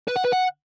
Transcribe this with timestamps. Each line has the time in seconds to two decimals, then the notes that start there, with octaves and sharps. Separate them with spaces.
0.08 B4
0.16 F#5
0.25 B4
0.33 F#5